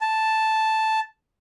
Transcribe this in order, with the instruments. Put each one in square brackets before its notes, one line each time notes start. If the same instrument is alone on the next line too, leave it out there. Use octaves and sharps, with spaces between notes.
[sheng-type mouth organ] A5